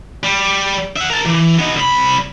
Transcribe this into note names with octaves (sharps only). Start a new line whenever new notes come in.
G3
E5 F#5
A#4 A5
E3
B3 D#4
C2 B5